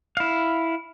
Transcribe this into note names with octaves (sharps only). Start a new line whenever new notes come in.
E4 F5